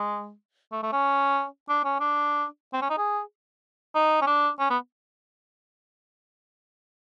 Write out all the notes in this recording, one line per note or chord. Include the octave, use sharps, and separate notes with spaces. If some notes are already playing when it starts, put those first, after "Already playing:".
Already playing: G#3
A3
A3
C#4
D4
C#4
D4
C4
C#4
D#4
G#4
D#4
C#4
D4
C#4
B3